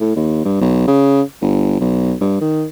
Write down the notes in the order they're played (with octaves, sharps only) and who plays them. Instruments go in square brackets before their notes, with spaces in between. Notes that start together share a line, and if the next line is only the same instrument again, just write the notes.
[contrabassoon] A2
D#2
G2
B1
C#3
G1
B1
G2
D#3